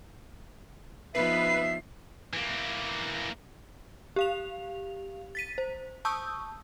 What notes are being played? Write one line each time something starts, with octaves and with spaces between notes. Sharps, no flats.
F3 B3 D#4 B4 E5 C7
E3 A#3
G4 F5 F7
A6 B6 D#7
C5
A5 C#6 D#6 E6 G6